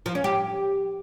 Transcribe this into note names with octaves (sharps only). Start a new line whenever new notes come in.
F3
C#4
G4